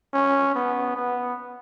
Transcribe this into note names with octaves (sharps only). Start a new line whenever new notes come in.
C#4
B3
B3